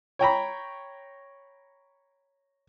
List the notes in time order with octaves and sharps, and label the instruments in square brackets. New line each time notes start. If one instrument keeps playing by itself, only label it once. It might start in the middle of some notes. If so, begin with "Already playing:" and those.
[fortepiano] C#5 G5 A#5 B5